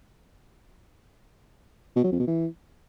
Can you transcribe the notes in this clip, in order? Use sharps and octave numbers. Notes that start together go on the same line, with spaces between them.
B2
F#3
F2
B2
E3